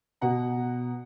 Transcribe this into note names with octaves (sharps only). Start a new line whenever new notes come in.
B2 F#5 A#5